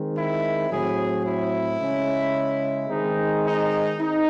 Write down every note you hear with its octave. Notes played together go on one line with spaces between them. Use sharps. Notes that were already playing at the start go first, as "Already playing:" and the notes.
Already playing: D#3 G#3 C4
E4
A2 F#3 C4 G#4
E4
C#3 G#3 C#4
D#3 G#3 C4 D#4
D#4
C4 D#4